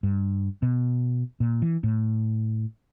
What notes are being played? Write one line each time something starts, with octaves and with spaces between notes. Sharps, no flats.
G2
B2
A#2
E3
A2